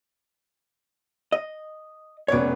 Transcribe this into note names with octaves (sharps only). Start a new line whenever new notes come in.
D#5
F1 B3 C#4 C#5 D5